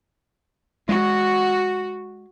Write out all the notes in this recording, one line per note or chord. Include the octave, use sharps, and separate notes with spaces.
G#3 F#4